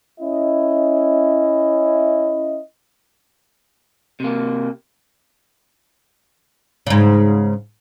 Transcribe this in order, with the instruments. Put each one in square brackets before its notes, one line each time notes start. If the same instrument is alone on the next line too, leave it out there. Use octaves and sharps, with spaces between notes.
[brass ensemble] C#4 E4 D#5
[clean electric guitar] C3 A#3
[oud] G#2 C#3